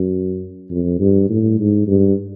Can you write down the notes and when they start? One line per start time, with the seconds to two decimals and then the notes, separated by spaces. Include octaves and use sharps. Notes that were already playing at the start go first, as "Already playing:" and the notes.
Already playing: F#2
0.70 F2
1.00 G2
1.29 A2
1.59 G#2
1.87 G2